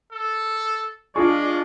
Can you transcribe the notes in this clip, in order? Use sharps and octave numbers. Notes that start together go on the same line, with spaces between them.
A4
G#3 D4 F4 G#4 D5 C#6